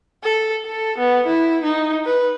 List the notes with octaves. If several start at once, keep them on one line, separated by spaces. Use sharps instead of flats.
A4
A4
B3
E4
D#4
B4